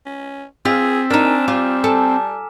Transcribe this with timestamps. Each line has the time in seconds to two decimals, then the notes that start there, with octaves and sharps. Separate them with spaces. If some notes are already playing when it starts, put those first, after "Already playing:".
0.06 C#4
0.65 C4 F4 G#4 E6 A6 B6
1.10 A#3 D4 D#4 A#5 F6 E7
1.25 G#5 E7
1.48 G3 F4 D6
1.84 A4 G#5